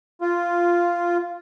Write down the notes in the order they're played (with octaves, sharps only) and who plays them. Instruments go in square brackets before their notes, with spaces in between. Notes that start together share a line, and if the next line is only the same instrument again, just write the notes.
[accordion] F4